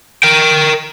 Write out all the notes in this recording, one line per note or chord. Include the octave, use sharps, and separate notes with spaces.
A#4 G5